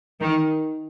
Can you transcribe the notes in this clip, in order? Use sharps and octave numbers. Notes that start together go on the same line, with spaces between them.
D#3